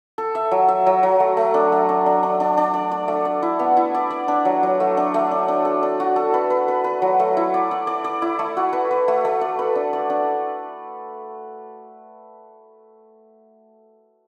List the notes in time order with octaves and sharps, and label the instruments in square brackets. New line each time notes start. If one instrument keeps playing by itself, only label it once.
[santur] A4
E5
F#3
E5
F#3
F#3
A3
A3
D4
A3
D4
D4
D4
D4
D4
D5
D5
A3
D5
E4
B3
E4
D5
D5
D4
F#3
F#3
A3
D4
A3
D4
D4
A4
D4
F#4
A4
B4
B4
B4
B4
F#3
A3
E4
D5
D5
D5
D5
E4
A3
F#4
B4
B4
A3
A3
D5
B4
D4
D5
D4